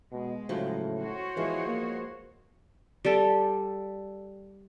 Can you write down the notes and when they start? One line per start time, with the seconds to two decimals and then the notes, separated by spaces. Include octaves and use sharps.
0.12 B2 G#3
0.49 A2 C#3 F3 F#3
0.99 F#4 C5 C#5
1.37 E3 F3 G#3 B3
1.66 A#3
3.05 G3 G4 A4 G5